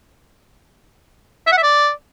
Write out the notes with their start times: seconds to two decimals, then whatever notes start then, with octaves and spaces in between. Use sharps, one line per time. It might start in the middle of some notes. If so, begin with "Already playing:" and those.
1.47 E5
1.52 F#5
1.57 E5
1.63 D5